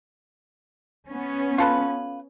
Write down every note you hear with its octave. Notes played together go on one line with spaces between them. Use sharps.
B3 C#4
F4 A4 B4